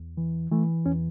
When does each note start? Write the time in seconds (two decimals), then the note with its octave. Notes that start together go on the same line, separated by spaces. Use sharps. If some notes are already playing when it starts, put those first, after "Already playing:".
Already playing: E2
0.17 E3
0.51 E3 A3
0.85 E2 C#4